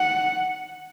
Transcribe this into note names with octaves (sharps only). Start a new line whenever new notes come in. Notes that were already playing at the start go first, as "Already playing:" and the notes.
Already playing: F#5